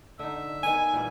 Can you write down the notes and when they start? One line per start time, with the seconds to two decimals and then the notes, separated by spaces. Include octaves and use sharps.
0.19 D3 D#4 E5
0.63 D#3 B3 G#5
0.93 A#2 E3 G3